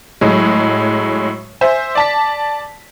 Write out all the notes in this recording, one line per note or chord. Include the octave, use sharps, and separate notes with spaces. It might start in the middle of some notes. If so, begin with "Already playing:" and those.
A2 F#3 G#3
C5 E5 G#5
D5 A5 B6